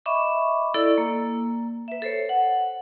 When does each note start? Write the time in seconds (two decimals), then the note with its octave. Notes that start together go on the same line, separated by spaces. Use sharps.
0.06 D#5 E5 B5 C#6 D6
0.74 E4 A4 D5
0.98 A#3
1.88 B4 E5
2.02 A4 C5 C#5
2.29 F#5